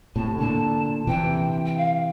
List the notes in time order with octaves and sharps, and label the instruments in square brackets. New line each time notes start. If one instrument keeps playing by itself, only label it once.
[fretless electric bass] A2 C3 [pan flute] A5
[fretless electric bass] A#2 D3 [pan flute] A5
[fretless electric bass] C3 E3 [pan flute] G5
[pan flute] G5
F5